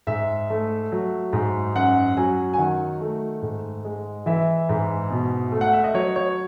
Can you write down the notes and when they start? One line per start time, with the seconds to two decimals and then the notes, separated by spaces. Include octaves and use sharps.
0.07 G#2 E5
0.50 A3
0.92 F#3
1.33 G#2
1.75 F#2 F#5
2.17 F#3 G#5
2.54 G#5
2.58 D#3 F#5
3.01 A3
3.42 G#2
3.85 G#3
4.26 E3 E5
4.69 G#2
5.10 B2
5.52 A3
5.61 F#5
5.73 E5
5.84 D#5
5.94 F#3 C#5
6.16 C#5